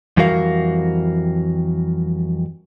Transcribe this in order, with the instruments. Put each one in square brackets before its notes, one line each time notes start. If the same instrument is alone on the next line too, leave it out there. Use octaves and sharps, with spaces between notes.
[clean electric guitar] F2 E3 G3 F#4 A#4 F5